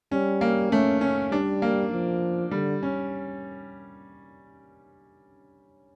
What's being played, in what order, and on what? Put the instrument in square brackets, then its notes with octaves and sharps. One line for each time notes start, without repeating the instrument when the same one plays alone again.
[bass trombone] G3 [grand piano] C#4
[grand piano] A#3
[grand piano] A3 [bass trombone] C#4
[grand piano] C#4
[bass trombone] G3 [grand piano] D4
[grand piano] A#3
[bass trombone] F3
[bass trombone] D3 [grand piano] G3
[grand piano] C#4